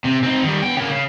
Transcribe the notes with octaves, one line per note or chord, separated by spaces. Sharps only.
C3
C4 D#4
D#3 G3
B2 G5
C#3 A#3
C#3